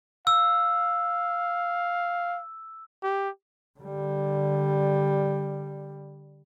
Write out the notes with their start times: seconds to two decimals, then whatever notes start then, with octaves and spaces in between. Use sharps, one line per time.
0.27 F5 E6
3.03 G4
3.79 D3 G3